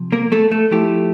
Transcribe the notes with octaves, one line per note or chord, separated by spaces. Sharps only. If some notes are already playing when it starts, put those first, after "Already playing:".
Already playing: C3 F3
A#3 A#4
A3 A4
A3 A4
F3 A3 E4 G4